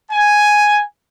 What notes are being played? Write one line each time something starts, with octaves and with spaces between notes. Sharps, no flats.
G#5